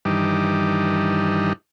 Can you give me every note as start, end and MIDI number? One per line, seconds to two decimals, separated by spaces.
0.05 1.53 43
0.05 1.53 51
0.05 1.53 52
0.05 1.53 55
0.05 1.53 62
0.05 1.53 63